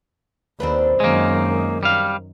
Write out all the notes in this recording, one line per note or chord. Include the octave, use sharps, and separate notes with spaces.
D#2 C4 D4 B4
F#2 D#3 G#3 A#3
G3 F5